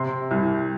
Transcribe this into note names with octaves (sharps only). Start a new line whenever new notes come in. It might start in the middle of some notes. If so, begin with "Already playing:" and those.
Already playing: C3 C6
C2